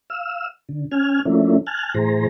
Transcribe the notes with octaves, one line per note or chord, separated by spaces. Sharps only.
F5 E6
D3
C#4 G#5 F6
F3 A3 A#3 C#4 D4 E4
G#5 A5 F6 F#6
A2 E3 G#4 C5 A#5